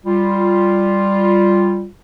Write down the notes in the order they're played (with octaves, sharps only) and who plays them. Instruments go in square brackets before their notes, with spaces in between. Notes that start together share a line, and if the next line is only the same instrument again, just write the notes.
[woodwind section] G3 F4